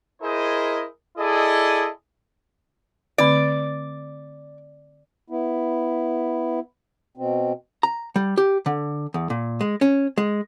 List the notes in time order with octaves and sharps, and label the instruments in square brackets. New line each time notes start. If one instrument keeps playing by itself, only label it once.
[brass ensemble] E4 G#4 A#4 C5 D#5
E4 G#4 A4 D5 D#5
[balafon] D3 A3 C4 [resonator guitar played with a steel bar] D5
[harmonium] B3 E4
B2 C4
[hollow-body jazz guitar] A#5
G3
G4
D3
E2
A#2
G#3
C#4
G#3